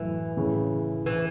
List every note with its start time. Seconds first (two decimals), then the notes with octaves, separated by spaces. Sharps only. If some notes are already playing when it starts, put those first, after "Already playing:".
Already playing: F#2 A2 E3
0.37 A2 C#3
1.06 E3